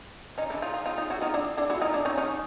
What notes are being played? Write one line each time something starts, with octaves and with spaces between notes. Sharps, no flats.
C#4 D#4
D4 E4
D#4 F4
D#4 F4
D#4 F4
D#4 F4
E4 F#4
D#4 F4
D4 E4
D4 E4
E4 F#4
D#4 F4
D4 E4
C#4 D#4
C#4 D#4